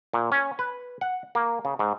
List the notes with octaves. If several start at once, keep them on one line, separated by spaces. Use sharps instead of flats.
A#2
C#4
B4
F#5
A#3
C#3
G#2